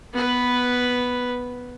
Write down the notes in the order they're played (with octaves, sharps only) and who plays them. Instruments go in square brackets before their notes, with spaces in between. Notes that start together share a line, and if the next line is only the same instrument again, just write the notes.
[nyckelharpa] B3 B4